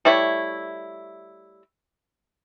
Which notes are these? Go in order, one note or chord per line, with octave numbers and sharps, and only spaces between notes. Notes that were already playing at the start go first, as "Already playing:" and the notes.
G3 A3 E4 C#5